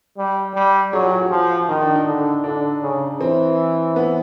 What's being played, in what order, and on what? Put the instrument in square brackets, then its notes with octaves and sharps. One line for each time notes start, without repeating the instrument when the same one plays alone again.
[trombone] G3
G3
[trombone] F#3 [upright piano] G#4
[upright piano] G4
F#4
G4
[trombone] F3
[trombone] D#3 [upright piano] D#4
[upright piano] D4
D#4
[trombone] D3
[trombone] D3 [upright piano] D4
[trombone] C#3
[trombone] E3 [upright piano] C4
[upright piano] B3